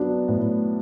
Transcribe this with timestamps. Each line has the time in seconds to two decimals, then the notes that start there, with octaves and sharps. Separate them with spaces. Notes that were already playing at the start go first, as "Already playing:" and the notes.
Already playing: F#3 B3 D4
0.28 A2